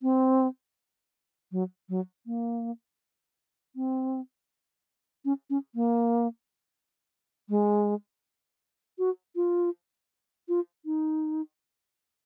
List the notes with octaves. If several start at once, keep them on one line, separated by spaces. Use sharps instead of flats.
C4
F#3
F#3
A#3
C4
C#4
C#4
A#3
G#3
F#4
F4
F4
D#4